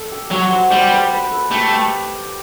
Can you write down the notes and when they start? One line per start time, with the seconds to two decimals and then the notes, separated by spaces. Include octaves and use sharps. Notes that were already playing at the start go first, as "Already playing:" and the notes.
Already playing: A4
0.11 G4
0.31 F#3 F#4
0.50 C5
0.71 G3 C5
0.91 B4
1.11 B4
1.31 A4
1.51 A3 G4